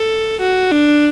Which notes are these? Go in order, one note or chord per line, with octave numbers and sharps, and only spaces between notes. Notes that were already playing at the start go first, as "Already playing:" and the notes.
Already playing: A4
F#4
D4